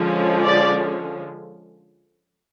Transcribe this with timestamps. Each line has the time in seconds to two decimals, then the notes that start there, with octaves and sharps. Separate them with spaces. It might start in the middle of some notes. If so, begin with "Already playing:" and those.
Already playing: D3 F3 G#3 C#4
0.45 D5